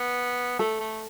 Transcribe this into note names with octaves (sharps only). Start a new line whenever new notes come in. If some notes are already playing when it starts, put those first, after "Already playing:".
Already playing: B3
A3 A4
A3